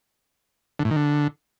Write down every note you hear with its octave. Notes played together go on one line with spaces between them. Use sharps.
D3
A2
D#3
D3